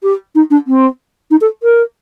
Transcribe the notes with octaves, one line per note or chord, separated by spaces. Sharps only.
G4
D#4
D4
C4
D#4
A4
A#4